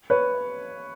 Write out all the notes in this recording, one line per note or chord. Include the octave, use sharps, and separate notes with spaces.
B4 C#5